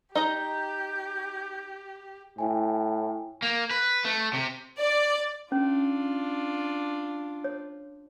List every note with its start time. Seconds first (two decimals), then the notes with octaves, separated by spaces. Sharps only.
0.15 D#4 G4 D#5 A#5 G6
2.38 A2 E4 G5 G#5
3.43 A#3
3.71 B4
4.05 A3
4.33 C3
4.79 D5
5.52 C#4 D4 F4
7.44 C#5